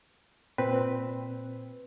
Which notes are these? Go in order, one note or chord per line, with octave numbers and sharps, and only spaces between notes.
A#2 C4 B4